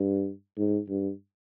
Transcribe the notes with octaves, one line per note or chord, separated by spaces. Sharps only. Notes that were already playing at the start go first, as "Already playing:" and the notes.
Already playing: G2
G#2
G2